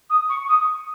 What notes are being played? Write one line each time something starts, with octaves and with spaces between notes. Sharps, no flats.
D#6
C#6
D#6